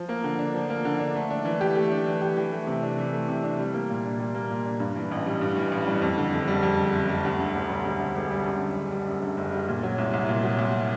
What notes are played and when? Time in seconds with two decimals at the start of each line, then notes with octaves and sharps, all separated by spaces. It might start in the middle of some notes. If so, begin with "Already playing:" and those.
Already playing: F3
0.09 A#3
0.24 D3
0.39 D4
0.55 F3
0.70 A#3
0.85 D3
0.99 D4
1.15 A3
1.30 D4
1.45 E3
1.61 G4
1.75 A3
1.91 D4
2.06 E3
2.22 G4
2.37 E3
2.52 A3
2.67 C3
2.83 D4
2.98 E3
3.13 A3
3.28 C3
3.43 D4
3.59 G3
3.74 A#3
3.90 A#2
4.04 D4
4.19 G3
4.34 A#3
4.50 A#2
4.66 D4
4.80 G2
4.96 E3
5.11 A1
5.26 G3
5.41 G2
5.57 E3
5.72 A1
5.87 G3
6.02 F2
6.18 D3
6.33 F#1
6.48 G3
6.63 F2
6.78 D3
6.93 F#1
7.09 G3
7.24 D2
7.40 D3
7.54 E1
7.69 G3
7.85 D2
8.00 D3
8.15 E1
8.31 G3
8.46 F#2
8.61 D3
8.76 F#1
8.92 G3
9.07 F#2
9.22 D3
9.37 F#1
9.52 G3
9.68 A#2
9.83 F#3
9.98 C2
10.14 C2
10.29 A#2
10.43 F#3
10.59 C2